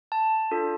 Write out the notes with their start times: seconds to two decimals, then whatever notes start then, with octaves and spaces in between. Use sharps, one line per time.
0.12 A5
0.51 D4 F4 A4